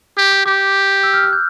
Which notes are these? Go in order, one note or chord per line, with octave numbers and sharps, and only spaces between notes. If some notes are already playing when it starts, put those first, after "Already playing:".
G4
D6
G4 D6
E6
F6
F#6
G6